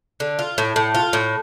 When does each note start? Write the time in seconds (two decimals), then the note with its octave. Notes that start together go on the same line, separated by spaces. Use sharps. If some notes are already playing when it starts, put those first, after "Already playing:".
0.20 D3
0.39 F4
0.58 A2
0.76 A2
0.95 F4
1.13 A2